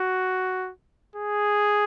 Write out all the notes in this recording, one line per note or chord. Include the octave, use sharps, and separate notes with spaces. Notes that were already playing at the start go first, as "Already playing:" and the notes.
Already playing: F#4
G#4